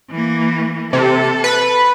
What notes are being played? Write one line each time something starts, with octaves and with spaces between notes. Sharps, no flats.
E3 A#3
C3 A4
B4